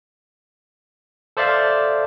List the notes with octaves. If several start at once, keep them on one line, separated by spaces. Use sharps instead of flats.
A4 C5 D5 E5 F5 A5